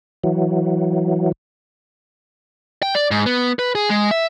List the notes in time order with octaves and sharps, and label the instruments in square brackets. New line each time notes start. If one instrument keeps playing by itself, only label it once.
[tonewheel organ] E3 F#3
[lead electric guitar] G5
D5
G#2
B3
B4
G#4
G#3
E5